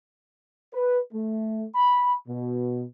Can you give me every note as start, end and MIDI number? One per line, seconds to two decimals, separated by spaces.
0.74 1.00 71
1.13 1.65 57
1.75 2.14 83
2.28 2.84 47